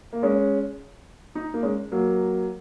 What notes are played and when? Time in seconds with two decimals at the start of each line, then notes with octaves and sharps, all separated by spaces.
0.13 A#3
0.23 G#3 C#4
1.35 D#4
1.54 A#3 D#4
1.63 G#3 C#4
1.92 F#3 A#3